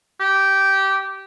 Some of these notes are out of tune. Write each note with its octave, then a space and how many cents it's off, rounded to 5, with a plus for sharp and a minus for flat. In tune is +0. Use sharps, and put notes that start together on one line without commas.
G4 -15